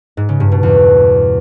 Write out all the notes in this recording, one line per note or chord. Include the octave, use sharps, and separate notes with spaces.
G#2
C#3
G2
B2
E2